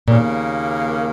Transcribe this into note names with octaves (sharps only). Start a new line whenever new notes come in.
D#2 A#2 C#3 A#3